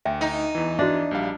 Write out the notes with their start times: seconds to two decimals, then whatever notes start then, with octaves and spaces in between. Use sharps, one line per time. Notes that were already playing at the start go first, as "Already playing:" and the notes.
0.05 D2 E5 G5
0.21 D#4
0.55 E2 E3
0.79 D4 F#4 E5
1.11 A#1 G3 F5